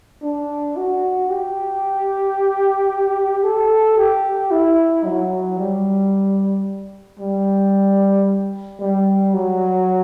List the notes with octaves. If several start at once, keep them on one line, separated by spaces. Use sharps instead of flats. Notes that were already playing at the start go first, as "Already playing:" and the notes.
D4
F#4
G4
A4
G4
E4
F#3
G3
G3
G3
F#3